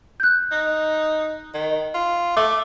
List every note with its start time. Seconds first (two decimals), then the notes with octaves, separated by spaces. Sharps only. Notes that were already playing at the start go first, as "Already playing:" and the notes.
0.20 F#6 G6
0.52 D#4
1.54 D#3
1.94 F4
2.36 A3 D6